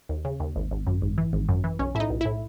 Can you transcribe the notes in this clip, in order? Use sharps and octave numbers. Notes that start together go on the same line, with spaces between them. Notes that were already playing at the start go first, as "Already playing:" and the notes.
D#2
C#3
D#2
G#1
G#1
F#2
G#1
E3
G#1
F#2
E3
B1 C#4
A2 E4
D#4
B1
A2 E4